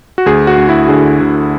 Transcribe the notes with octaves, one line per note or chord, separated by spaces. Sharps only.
F#4
D2 G#4
F#4
D2
E4
D3 G#4
D2